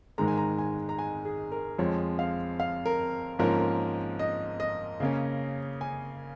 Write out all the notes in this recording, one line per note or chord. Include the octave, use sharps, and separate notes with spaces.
G#2 D#3 G#3 A#5
G#5
A#5
G#5
A#5
G#5
G#4
A#4
F2 F3 G#3 C#5
F5
F5
A#4
G#2 F3 A#3 C#4 A#4
A#4
D#5
D#5
C#3 A#3 C#4
G#5